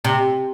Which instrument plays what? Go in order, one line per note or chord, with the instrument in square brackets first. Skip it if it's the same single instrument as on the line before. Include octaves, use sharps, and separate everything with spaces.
[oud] C3